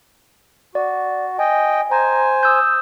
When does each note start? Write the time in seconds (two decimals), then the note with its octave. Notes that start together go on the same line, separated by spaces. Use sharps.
0.75 F#4 D5
1.39 D#5 G5 G#5
1.92 C5 G#5 A#5
2.43 D#6 E6 G6